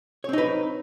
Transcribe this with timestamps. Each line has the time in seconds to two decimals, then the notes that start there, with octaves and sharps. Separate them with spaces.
0.24 C#5
0.29 C4
0.33 D#4
0.38 B4